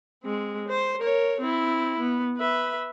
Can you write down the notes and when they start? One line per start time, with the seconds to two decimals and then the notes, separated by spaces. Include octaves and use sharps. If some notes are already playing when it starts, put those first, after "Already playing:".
0.23 G#3 C4
0.68 C5
1.01 A#4 C#5
1.40 C4 E4
2.00 B3
2.37 B4 E5